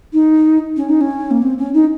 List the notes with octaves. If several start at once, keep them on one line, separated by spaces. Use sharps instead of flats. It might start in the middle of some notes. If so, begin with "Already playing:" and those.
D#4
C#4
D#4
C#4
A#3
C4
C#4
D#4